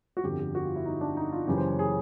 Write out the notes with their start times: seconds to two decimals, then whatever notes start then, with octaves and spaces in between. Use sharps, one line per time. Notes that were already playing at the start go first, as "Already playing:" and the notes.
0.17 F#4
0.24 G1 F2 D3 G4
0.40 G4
0.55 F#4
0.65 F4
0.76 E4
0.86 D#4
1.01 D4
1.17 D#4
1.32 F4
1.47 F#1 F#2 C#3 E3 G4
1.57 C5
1.68 C#5
1.79 G#4